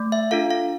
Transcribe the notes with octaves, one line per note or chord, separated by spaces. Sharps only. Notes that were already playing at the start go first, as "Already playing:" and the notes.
Already playing: A3
E5
D4 F4 A4 F5
F5